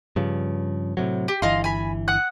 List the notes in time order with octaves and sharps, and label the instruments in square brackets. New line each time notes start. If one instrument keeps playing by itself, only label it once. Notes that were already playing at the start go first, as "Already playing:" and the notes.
[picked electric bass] G2 C#3 F3
A2 C3 F#3
[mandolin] G4
[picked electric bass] G1 E3 [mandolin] D#5 F5 C6
[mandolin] G#5 B5
F#5 D#6 F#6